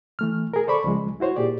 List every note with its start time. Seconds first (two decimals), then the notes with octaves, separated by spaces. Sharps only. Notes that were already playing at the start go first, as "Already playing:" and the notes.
0.19 E3 A3 F6
0.54 G#4 A#4
0.67 A4 C5 D5 B5 C#6
0.84 C#2 F3 G#3
1.20 E4 F#4 C5 C#5
1.36 A#2 G4 G#4 D5